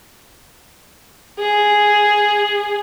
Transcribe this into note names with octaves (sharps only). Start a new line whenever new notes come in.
G#4